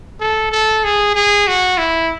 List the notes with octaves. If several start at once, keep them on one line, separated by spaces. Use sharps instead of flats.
A4
A4
G#4
G#4
F#4
E4